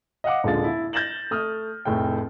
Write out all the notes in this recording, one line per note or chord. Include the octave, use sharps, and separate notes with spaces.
D#5 F5 F#5 D6
D#1 D3 G#3 F4 A6
E4
G6 A6 A#6 E7 F#7
A3 D#6 F6
F1 A2 G#4 G5